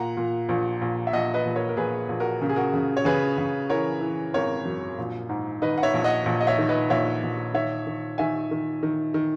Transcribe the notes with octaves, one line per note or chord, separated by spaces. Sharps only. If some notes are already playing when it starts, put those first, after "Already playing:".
Already playing: A#2 F#5 A#5
A#2
A#1
A#1
E5
A#1 D#5 F#5
B4 D#5
A#1
A#4 C#5
A#4
A#1 G#4 B4
A#1
F#4 A#4
C#3 A#4
G#4
F#4 A#4
C#3
C#5
C#3 G#4 B4
C#3
E3 A#4 C#5
E3
G#1 A#4 C#5
F#2
A#1
G#2
D#3 B4 D#5
F#5
C#5 E5
A#1
D#5 F#5
A#1
D#5
C#5 E5
D#3
B4 D#5
A#1 C#5 E5
A#1
D#3 C#5 E5
D#3
D#3 E5 G#5
D#3
D#3
D#3